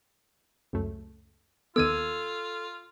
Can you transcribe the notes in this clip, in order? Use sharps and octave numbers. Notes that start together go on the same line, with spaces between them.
C#2 F#2 A3
D#2 D#3 B3 F4 A4 E6 G#6 D#7